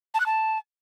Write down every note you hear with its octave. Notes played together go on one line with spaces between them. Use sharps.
A5
F#6
A5